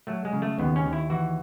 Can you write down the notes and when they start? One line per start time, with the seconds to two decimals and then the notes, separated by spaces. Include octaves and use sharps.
0.07 F#3 A3
0.25 G#3
0.33 C#3
0.42 A3
0.59 D#2 B3
0.76 C#4
0.85 D#2
0.93 E4
1.10 E3 F#4